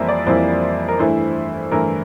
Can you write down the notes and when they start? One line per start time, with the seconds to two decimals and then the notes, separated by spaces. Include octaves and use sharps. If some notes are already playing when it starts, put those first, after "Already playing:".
Already playing: F2 E3 G3 A#3 E4 A#4 C5 E5
0.08 D5
0.26 F2 E3 G3 A#3 E4 C5
0.88 A#4
0.99 G2 E3 A3 E4 C5
1.71 G2 E3 A3 E4 A#4